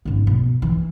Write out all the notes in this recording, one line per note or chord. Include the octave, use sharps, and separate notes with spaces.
G#1 C#3
B2
E3